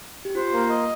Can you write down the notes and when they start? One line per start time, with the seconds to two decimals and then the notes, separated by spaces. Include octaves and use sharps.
0.25 G4
0.35 F4 C5
0.53 A#3
0.70 D#5